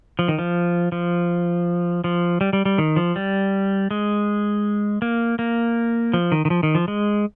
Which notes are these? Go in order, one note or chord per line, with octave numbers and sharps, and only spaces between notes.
F3
D#3
F3
F3
F3
G3
G3
G3
D#3
F3
G3
G#3
A#3
A#3
F3
D#3
D#3
F3
D#3
F3
G#3